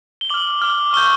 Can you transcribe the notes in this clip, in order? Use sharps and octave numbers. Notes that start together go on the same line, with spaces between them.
G7
D6 F6 F#7
D6 F6
C#6 E6 G6 G7